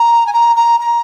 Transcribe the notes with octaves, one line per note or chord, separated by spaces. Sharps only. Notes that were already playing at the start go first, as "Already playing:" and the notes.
Already playing: A#5
G#5
A#5
A#5
A#5